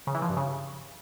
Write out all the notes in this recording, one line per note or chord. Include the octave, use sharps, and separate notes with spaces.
C#3
E3
F3
G2
C#3